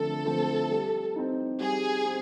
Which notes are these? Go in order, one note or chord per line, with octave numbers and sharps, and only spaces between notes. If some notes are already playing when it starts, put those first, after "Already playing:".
Already playing: D3 F3 A3 C4 A4
F3 A3 C4
G3
C4 D#4
G3 G#4
C4